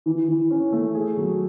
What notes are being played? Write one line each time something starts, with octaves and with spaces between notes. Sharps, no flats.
E3
E3
C#4
A3
G#4
F#3